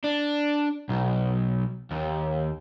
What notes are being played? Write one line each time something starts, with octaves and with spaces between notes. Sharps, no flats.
D4
B1
D#2